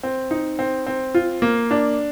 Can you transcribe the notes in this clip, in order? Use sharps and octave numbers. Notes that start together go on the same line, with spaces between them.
C4
D#4
C4
C4
F4
A#3
D4